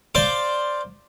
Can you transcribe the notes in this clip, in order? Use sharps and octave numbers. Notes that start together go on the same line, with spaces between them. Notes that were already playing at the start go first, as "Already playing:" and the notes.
C5 D5 F5